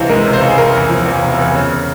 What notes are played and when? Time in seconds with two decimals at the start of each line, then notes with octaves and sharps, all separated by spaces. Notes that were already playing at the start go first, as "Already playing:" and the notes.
Already playing: C#2 C3 E3 C5
0.09 G#3 A#4
0.26 C3
0.33 C5
0.42 C#2
0.48 G#4
0.57 C3 A#4
0.74 E2
0.89 F3
1.06 E2
1.22 C3
1.38 E2
1.55 C#3